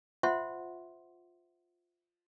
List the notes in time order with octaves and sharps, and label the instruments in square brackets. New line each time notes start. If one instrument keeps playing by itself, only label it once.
[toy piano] F4 C5 E5 F#5 C6